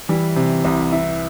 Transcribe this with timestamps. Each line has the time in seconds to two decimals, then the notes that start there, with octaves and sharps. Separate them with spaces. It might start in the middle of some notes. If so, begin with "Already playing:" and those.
0.09 E3 G3
0.36 C3
0.65 C2
0.92 E4